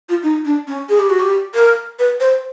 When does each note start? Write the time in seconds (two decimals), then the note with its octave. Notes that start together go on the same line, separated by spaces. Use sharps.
0.09 F4
0.23 D#4
0.45 D4
0.68 C#4
0.89 G#4
0.99 G4
1.10 F#4
1.20 G4
1.55 A#4
1.99 B4
2.20 C5